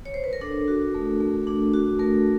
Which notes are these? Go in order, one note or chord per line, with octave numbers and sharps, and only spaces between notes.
C#5
C5
B4
A#4
D4 A4
F#4
A3
A3
D4
F#4
A3 A#4